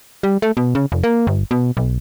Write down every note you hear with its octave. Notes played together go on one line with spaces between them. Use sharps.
G3
A3
B2
C#3
F1
A#3
G1
B2
B1